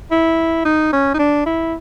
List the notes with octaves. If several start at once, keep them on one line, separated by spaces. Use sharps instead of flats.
E4
D#4
C#4
D#4
D4
E4